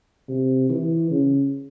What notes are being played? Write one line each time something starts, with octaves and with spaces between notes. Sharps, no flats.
C3
E3
C#3